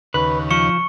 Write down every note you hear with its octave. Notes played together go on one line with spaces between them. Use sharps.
D#2 C#3 B4
F3 C#6 C#7